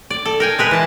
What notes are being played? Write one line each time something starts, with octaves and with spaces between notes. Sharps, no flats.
D5
A4
A#4 G5 G#5
G#3 A#4 B4
E3 A5